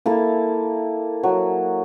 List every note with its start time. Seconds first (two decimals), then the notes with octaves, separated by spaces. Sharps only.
0.06 A#3 E4 A4
1.23 F#3